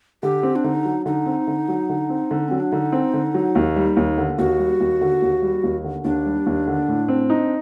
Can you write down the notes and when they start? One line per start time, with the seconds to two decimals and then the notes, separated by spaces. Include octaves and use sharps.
0.23 D3 G4
0.43 C4
0.56 D4
0.64 D3 D#4
0.85 F#3
1.06 D3 D#4
1.26 C4
1.47 D3
1.68 F#3
1.89 D3
2.09 C4
2.31 D3
2.48 F#3 C4
2.60 D4
2.72 D3 D#4
2.92 C4
3.14 D3
3.34 F#3
3.55 D#2
3.76 G3
3.97 D#2
4.18 D3
4.38 D#2 F#4
4.59 G3
4.80 D#2
5.01 D3
5.22 D#2
5.42 G3
5.63 D#2
5.84 D3
6.04 D#2 D4
6.26 G3
6.46 D#2
6.67 D3
6.88 A2
7.08 C4
7.30 D#4